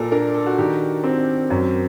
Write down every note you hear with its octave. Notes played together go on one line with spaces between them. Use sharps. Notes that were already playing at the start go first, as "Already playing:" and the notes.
Already playing: A#2 A4 A#4
D4 A#4
A4
F#4
D#3 G4
C4
F#2